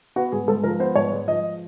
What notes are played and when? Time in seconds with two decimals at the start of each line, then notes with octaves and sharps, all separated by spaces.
0.16 B3 F#4
0.32 G#2 G#4
0.48 G#3 A4
0.63 F3 A#4
0.80 B3 C5
0.95 G#2 C#5
1.12 G#3
1.28 F3 D#5